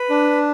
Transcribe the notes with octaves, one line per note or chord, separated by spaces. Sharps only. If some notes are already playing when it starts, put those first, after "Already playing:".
Already playing: B4
D4